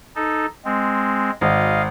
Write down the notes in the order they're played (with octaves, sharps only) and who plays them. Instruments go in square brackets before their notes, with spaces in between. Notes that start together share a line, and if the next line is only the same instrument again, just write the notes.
[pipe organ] D#4 A4
G#3 C4
[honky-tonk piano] G#1 [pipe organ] D#5 F5